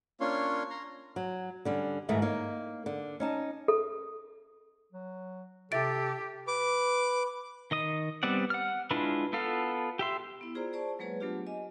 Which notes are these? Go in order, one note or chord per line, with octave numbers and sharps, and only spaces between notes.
A#3 C#4 D4 F4 C#5 C6
A#5 C6
F#3
D3 G3 C#4
G#2 D#3 E3 A3
A#3 D#4 C#5
D3
C#4 D#4 A5
A4
F#3
C3 G4 A4 E5 A6 D7
B4 D6
D#3 D#5 D#6
G3 B3 C4 D5 F#5
F#5 F6
G#3 D4 E4 F4 B4
B3 F4 A4 F5
G4 E5 C6
B3 E4
F4 G#4 C5 D5 A#5
G#4 C5 D5 A5 C#6
F#3 G#3 A#3 G#4 B4 C#5
F#3 A3 B3 D4 F4 G4
D#5 G#5